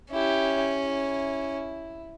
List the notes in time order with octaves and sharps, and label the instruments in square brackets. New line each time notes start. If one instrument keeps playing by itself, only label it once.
[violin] C#4 [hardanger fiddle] E4 G4
[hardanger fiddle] E4